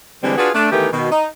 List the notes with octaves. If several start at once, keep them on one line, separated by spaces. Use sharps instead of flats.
D3 E3 G3 G#3 C4 D4
D4 F4 F#4 G#4 B4
A3 D4
D#3 E3 A3 B3 G4 A#4
B2 D#3
D#4